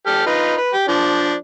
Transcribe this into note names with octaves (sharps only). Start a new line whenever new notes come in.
G4 A4 F6
D#4 F4 B4
B4
G4
F3 D4